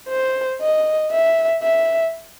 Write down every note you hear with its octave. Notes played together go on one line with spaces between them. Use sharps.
C5
D#5
E5
E5